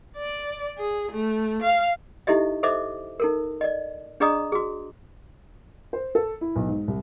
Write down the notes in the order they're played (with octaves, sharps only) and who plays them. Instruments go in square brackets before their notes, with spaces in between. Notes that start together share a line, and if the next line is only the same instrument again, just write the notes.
[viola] D5
G#4
A3
F5
[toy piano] D#4 E4 G4 A4 D#5 E5
A4 C5 D#5 E5 D6
D#4 A4 A#4
D5 D#5
D4 G#4 D5 D#5 A#5 D#6
F#4 G#4
[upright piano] C5
A4
E4
B1
G#2
C2